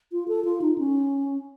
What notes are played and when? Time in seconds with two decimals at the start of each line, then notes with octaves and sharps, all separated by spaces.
0.12 F4
0.28 A4
0.45 F4
0.62 D#4
0.78 C#4